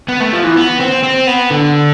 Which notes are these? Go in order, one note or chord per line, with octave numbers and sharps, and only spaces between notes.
B3
A3
F3
E3
B3
C4
C4
B3
D3